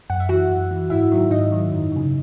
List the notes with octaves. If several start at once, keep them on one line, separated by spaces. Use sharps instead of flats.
F#2 F#5
E5
E3 F#4 F#5
F#2
E3
G#2 E4 E5
D#3 F#3
G#2 D#4 D#5
D#3 F#3
F#2
C#3 F#3